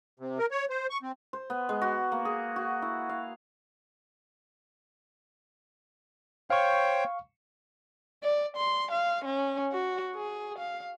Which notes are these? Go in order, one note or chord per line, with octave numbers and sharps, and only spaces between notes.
C3
A#4
C#5
C5
C#6
C4
C5
B3
G#3
F#4
A#3
G#4
F#4
E4
F5
C5 C#5 F5 G5 C#6
D5
C6
F5
C#4
F#4
G#4
F5